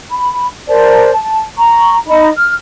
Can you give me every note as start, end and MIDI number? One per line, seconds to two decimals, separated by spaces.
0.11 0.46 83
0.69 1.10 70
0.69 1.10 72
0.69 1.10 74
0.69 1.10 81
1.12 1.43 81
1.58 1.97 82
1.58 1.97 85
2.07 2.31 63
2.07 2.31 75
2.07 2.31 83
2.37 2.53 89